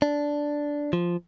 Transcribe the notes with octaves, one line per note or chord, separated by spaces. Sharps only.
D4
F3